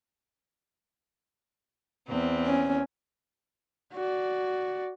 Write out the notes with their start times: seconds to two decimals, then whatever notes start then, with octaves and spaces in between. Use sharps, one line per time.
2.08 E2 C4
2.46 C#4
3.93 F#4 D5